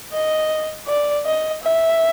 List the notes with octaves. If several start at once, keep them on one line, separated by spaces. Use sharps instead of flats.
D#5
D5
D#5
E5